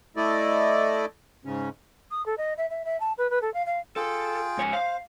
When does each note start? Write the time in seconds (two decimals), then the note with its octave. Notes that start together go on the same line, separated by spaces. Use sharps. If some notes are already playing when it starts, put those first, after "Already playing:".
0.16 A3 E4 A4 D5 D#5
1.45 G#2 C#3 C#4
2.11 D#6
2.26 A4
2.37 D#5
2.57 E5
2.70 E5
2.85 E5
3.00 A5
3.18 B4
3.30 B4
3.41 A4
3.54 F5
3.66 F5
3.96 F4 G#4 A4 G5
4.58 G#2 C#5 G#5
4.73 C5 F5